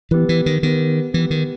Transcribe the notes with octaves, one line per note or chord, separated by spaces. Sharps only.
E3 B3 G4 B4
E3
D#3
D#3 B3 G4 B4
E3 B3 G4 B4
D#3